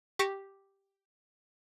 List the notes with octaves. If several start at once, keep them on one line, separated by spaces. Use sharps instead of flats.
G4 C#6 D6 A#6 C#7 E7